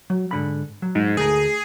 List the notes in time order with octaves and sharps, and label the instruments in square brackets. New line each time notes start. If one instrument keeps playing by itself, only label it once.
[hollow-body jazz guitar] F#3
G#2 D3 B5
F#3
[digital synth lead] G#2
[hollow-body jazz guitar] D2 A3 A#4 [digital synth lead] G#4